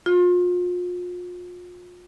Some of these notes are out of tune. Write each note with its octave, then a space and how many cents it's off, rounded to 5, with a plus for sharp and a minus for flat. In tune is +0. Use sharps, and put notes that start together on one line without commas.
F4 +35